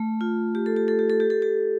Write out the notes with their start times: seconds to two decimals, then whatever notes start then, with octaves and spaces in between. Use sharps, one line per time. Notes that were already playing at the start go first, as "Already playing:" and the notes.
Already playing: A3
0.21 F4
0.55 G4
0.66 A4
0.76 G4
0.88 A4
0.99 G4
1.10 A4
1.20 G4
1.30 A4
1.42 G4